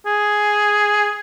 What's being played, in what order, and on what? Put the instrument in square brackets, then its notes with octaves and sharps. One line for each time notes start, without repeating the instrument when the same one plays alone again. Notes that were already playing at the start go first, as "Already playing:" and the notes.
[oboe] G#4